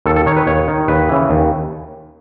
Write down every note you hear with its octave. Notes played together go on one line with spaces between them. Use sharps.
D#2 A4
A4
D#3 C#5
B4
D#2 C#5
D#3
D#2 B4
C#3 E3
D#2